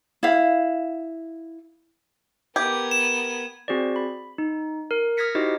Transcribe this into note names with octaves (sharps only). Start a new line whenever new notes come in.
E4 F5
B3 G4 A#4 G#6
E7
C4 F#4 G#4 C5 D5
B5
D#4
A#4
D#6 F6 G#6 A#6 B6 C#7
D#4 E4 F#4 G4 C5 D#5